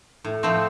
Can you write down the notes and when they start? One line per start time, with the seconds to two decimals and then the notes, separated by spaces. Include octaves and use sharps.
0.24 A2
0.43 F3 A3 C4